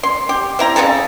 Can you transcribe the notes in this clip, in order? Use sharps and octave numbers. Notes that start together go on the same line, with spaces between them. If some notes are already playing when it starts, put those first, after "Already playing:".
C6
G4
C4 E4 A#5
C#3 G3 C4 A4